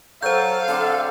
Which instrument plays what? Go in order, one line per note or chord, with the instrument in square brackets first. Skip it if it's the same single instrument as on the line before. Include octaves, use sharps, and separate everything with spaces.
[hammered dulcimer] F#3 [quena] A4 [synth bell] C5 G6 [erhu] F5
[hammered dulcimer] D3 C4 D6 [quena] A4